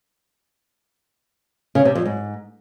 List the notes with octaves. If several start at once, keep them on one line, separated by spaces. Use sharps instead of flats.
C#3
C3
F2
G#2